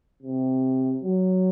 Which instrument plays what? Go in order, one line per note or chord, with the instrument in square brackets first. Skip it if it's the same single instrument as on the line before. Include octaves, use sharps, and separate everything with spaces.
[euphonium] C3
F#3